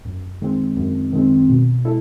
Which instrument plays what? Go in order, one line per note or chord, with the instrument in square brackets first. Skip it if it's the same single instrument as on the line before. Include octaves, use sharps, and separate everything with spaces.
[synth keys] F#2
D#3 G#3 C4
F#2
D#3 G#3 C4
B2
G#3 E4 A4